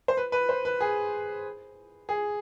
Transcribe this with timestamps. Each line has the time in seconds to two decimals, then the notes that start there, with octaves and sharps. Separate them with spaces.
0.08 C5
0.17 B4
0.32 B4
0.49 C5
0.65 B4
0.80 G#4
2.09 G#4